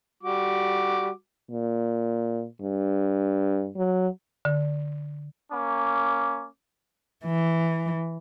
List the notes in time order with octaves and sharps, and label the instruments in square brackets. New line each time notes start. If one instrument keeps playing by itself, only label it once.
[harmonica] G3 F#4 D6
[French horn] A#2
G2
F#3
[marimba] D3
[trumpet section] A#3 C#4 D6
[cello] E3